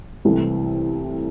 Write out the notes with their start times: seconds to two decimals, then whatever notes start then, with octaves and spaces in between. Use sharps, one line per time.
0.25 C2 C3 E3 A3 C4